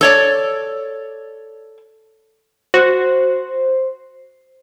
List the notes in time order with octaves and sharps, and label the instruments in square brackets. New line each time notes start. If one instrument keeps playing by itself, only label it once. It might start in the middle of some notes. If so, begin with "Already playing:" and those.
[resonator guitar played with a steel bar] A4 C#5 D5
[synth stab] F#4 [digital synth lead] C5